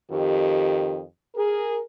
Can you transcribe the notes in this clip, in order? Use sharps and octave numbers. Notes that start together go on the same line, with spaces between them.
F2 D#3 G4
G#4 A#4